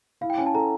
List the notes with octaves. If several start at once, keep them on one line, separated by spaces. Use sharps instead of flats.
E4 F5
G5
C#4 G#5
A5
A4 A#5